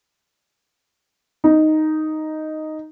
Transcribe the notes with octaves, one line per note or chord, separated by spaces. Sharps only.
D#4